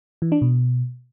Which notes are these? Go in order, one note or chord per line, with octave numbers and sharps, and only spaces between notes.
E3
D4
B2